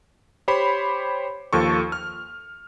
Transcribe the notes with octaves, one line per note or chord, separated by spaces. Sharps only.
G4 C5 C#5 B5
D#2 F3 A4 C#6
F6